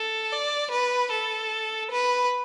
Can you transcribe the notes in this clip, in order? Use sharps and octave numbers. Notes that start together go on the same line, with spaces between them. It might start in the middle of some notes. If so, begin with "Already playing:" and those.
Already playing: A4
D5
B4
A4
B4